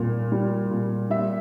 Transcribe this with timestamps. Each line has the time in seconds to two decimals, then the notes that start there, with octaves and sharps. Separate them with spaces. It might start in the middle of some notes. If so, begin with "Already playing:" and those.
Already playing: A#2 G3
0.32 G3
0.71 A#2
1.10 G3 E5